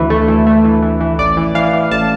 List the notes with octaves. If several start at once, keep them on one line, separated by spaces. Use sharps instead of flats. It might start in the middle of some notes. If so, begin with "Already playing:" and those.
Already playing: D2 E3 B4
A3
E3
A3
E3
E3
E3
A1 D5
E3
E3 F5
E3
A1 A5